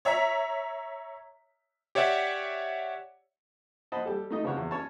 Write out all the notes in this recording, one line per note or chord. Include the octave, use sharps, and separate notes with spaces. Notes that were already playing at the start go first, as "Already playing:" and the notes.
C#5 E5 A#5 B6
G4 C#5 D5 E5 F#5
C5 D#5 F#5 A5 B5
G3 G4 A4
A3 D#4 D#5
C#3 F3 C4 C#5 F#5
E2
C#4 C#5 A5